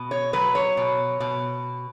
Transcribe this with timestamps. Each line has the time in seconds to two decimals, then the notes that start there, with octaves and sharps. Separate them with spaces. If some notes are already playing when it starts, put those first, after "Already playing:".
Already playing: B2
0.11 C#5
0.33 F#3 B4
0.55 C#5
0.77 B2
1.20 B2